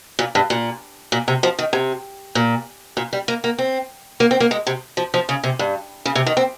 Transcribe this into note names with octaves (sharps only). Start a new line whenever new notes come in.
A#2
G2
A#2
A#2
C3
F3
D#3
C3
A#2
A#2
G3
A#3
A#3
C4
A#3
C4
A#3
G#3
C3
F3
F3
C#3
C3
G2
C#3
C3
D#3
C4